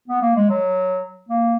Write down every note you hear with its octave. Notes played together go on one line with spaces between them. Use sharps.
B3
A#3
G#3
F#3
A#3